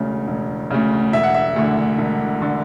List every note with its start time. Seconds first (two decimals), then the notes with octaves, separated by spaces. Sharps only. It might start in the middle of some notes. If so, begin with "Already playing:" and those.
Already playing: E1 D2 C#3
0.28 E1
0.71 D2 C#3
1.13 E1 E5
1.23 F#5
1.34 E5
1.56 D2 D3
1.98 E1
2.42 D3